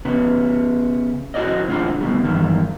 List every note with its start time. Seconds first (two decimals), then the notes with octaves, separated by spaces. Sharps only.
0.05 C#3 B3
1.34 E4 F#4 A4 C5 D5 D#5
1.68 A2 C#3 D4 F4 C5
2.01 D2 G2 B2 G3
2.24 E2 G2 D#3